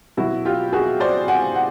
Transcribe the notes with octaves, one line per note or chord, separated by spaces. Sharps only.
B2 F#3 E4 F#4
F4 G4
F#4 G#4
C5 D5
F#5 G#5
F#5